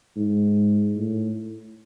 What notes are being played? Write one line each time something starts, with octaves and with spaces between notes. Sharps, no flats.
G#2
A2